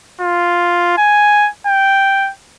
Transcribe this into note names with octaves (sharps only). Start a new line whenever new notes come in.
F4
G#5
G5